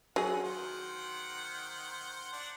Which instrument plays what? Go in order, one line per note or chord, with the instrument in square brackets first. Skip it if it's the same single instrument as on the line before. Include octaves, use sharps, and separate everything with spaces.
[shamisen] F#3 G#4 [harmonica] F#5
[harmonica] D#3 C5 F#5
D4 F#5